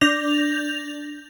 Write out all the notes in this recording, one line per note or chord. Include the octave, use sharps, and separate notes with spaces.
D4 G6 A#6 F7